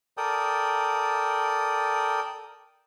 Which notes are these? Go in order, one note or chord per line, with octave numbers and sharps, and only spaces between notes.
A4 A#4 D5 G5 D#6